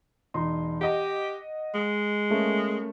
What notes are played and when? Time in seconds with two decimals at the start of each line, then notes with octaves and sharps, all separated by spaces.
0.34 E1 D#4 C6
0.81 G4 D#5 F#5
1.74 G#3
2.30 A3 A#3 C#4